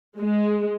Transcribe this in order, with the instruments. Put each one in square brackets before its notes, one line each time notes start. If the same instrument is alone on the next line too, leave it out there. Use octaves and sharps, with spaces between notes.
[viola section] G#3